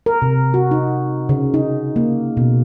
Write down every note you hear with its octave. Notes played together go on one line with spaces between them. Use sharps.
A#4
C3
F#4
D#4
C#3
D#4
A#3
B2